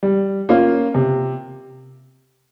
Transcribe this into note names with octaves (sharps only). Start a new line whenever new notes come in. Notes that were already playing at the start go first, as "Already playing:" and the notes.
G3
A#3 C#4 F4
C3